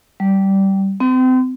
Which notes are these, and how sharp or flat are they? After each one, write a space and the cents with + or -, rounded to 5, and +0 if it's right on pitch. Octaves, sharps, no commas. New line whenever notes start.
G3 -15
C4 -35